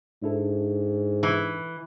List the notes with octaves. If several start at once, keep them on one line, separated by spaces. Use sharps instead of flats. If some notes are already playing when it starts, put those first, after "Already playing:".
G#2 D4 E4 A4
E3